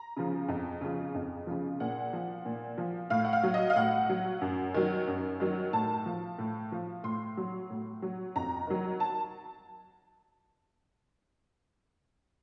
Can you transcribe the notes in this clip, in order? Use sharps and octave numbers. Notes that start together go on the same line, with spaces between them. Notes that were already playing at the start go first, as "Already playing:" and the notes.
Already playing: A#5
C#3 F3
F2
C#3 F3
F2
C#3 F3
A#2 F#5
F3
A#2
F3
A2 F5
F#5
F5
F#3
D#5
F5
A2 F#5
F#3
F#2
D#3 F#3
F#2
D#3 F#3
A2 A5
F3
A2
F3
A2 C6
F#3
A2
F#3
F2 A#5
D#3 F#3
A5